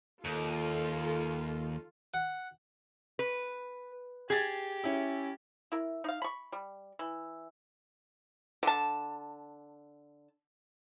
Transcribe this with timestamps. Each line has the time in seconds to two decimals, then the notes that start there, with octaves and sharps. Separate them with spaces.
0.25 D#2 F4 A4
2.14 F#5
3.19 B4
4.30 G4 G#4 G#6 A6
4.84 C#4 E4
5.72 E4 A#4
6.04 D#4 F5
6.22 B5 C#6
6.52 G3
6.99 E3
8.63 D3 A5